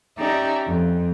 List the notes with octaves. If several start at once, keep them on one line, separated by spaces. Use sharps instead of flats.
C#4 D#4 G4 D5 E5 A#5
F2